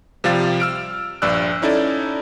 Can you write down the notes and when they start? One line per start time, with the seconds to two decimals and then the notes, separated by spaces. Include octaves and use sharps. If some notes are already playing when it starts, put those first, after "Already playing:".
0.24 C3 F3 G3 F5 A6
0.60 E6 F6 D7
1.22 A#1 G2 D5 E6 F#6
1.62 C#4 D#4 E4 A4 D5